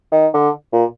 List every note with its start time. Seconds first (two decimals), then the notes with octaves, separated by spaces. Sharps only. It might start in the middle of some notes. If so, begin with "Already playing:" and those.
0.12 D#3
0.34 D3
0.72 A#2